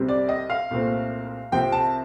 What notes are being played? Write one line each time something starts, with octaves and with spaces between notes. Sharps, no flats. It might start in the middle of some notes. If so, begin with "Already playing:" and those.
Already playing: C2 C3 G3 C4
D5
D#5
F5
C2 A#2 A3 C4
C2 C3 F3 C4 G5
A5